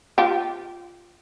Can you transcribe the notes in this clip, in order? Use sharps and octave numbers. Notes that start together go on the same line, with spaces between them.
F4 G4